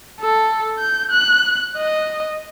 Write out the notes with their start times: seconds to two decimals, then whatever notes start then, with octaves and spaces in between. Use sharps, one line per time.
0.21 A4
0.79 G6
1.11 F#6
1.77 D#5